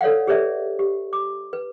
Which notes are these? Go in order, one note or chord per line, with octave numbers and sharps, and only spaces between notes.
A4 C#5 D5 F5 F#5
G4 G#4 B4 C#5 D5 E5
G4
D6
B4